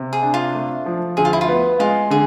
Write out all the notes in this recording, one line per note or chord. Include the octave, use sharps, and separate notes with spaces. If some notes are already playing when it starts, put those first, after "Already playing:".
Already playing: C3
G#4
D4
F4
A3
F3
D2 G#4
F4
E4
F4
B3
G#3 F4
D3 G#4